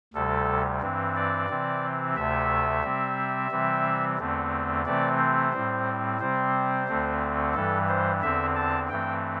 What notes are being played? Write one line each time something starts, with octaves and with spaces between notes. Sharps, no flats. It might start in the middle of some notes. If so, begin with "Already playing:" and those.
D2 C3 G3 A4
G2 E3 C4
D5
C3 E3 C4
D2 C3 A3 E5
C3 G3 C4
C3 E3 G3 C4
E2 D3 A3 C4
C3 E3 A3 C4 D5
C5
A2 G3 C4
C3 G3 C4 C5
D2 D3 A3 C4
G2 E3 G3 A4
C5
E2 D3 C4 E5
A5
G2 E3 A3 C4 G5